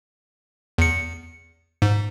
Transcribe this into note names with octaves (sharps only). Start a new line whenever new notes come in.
E2 C#7
G#2